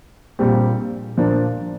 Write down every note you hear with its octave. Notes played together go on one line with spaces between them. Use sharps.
A#1 A#2 G3 C4 G4
A#2 F3 A#3 D4